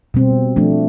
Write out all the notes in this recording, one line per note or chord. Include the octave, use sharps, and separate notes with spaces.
B2 G3 C4
F3 A3 D4